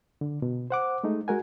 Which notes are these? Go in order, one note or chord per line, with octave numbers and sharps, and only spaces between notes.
D3
B2
C5 F#5 D6
G#3 A3 D#4
G#3 F#4 A#4 F#5 G#5